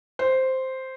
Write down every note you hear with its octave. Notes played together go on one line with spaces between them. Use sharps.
C5